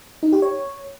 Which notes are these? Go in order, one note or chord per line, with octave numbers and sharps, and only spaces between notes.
D#4
G4
C#5